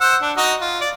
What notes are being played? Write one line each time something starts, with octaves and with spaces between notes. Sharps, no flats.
C5 F#5 E6
D4
D#4 F#4 D#5
F4
D5